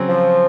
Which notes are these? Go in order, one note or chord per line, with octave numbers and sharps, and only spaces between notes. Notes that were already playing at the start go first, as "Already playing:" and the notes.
Already playing: C#3 F#3 C4
F3